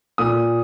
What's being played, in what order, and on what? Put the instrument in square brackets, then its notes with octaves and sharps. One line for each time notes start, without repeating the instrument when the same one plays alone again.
[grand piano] A#2 D#6